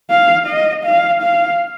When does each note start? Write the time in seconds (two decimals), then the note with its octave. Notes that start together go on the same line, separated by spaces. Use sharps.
0.11 F5
0.47 D#5
0.85 F5
1.22 F5